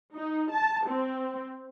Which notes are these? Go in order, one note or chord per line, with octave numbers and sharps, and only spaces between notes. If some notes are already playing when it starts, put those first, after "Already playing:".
D#4
A5
C4